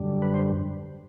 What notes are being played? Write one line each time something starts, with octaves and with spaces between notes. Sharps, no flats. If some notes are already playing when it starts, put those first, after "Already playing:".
Already playing: F#2 D3 G3
B4
C5